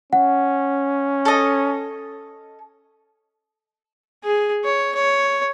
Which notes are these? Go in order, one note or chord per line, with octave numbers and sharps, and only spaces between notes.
C#4 F#5
A4 D#5
G#4
C#5
C#5